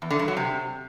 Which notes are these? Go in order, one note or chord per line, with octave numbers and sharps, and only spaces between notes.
E2
D3
G2
F#3
C3